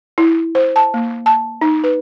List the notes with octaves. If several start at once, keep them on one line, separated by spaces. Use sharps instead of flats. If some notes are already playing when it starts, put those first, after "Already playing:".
E4
C5
A5
A#3
A5
D#4
B4